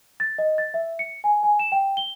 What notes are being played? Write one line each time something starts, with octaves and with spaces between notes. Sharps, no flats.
A6
D#5
A6
E5
C#7
G#5
G#5
E7
G5
G7